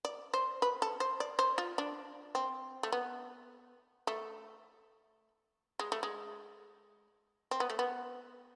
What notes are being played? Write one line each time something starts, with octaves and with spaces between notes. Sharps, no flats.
D5
C5
B4
A4
C5
D5
C5
F4
D4
C4
A3
B3
A3
G#3
A3
G#3
C4
B3
A3
B3